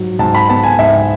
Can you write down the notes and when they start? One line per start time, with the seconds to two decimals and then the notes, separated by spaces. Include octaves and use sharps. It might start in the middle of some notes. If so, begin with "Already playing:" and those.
Already playing: G#2 F#3
0.19 G#2 A5
0.35 B5
0.49 B3 A5
0.64 G#5
0.79 G#2 E5